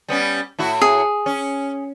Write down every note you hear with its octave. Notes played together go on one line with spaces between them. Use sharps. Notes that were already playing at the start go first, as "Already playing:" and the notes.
G3 B3 C#4
A2 E4 F#4
G#4
C#4